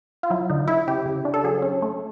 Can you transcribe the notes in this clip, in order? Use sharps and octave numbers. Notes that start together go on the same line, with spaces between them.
F4
F#3 E4
D3 D#4
D3 E4
C#3 G4
C#3
D4
A4
F#3 G#4
C#4
A3